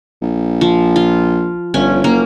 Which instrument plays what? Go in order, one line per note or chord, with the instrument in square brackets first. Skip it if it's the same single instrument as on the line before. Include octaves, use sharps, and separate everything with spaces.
[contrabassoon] A#1
[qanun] F3
F4
[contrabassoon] G1 [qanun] C#4
[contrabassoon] F#1 [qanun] A#3